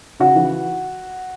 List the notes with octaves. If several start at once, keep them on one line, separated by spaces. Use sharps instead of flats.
C#3 F#4 F#5
E3